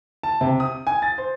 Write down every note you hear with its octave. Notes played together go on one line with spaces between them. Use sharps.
A5
C3
D#6
G#5
A6
C5